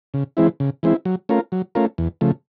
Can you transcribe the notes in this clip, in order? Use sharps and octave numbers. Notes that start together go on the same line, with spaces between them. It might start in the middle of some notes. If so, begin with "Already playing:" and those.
C#3
E3 G#3 C4 E4
C#3
E3 G#3 C4 E4
F#3
A3 C#4 F4 A#4
F#3
A3 C#4 F4 A#4
E2
C#3 F3 A3